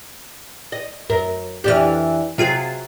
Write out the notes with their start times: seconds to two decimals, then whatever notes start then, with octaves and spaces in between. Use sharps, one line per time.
0.72 D#5
1.10 F#2 A#4
1.64 F2 E3 D4 G4 F6
2.38 C3 F#3 F4 G#4